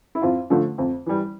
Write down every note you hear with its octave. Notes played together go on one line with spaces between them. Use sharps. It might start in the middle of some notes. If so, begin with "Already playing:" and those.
E4
F2 F4
D3 F3 A3
F2
E3 G3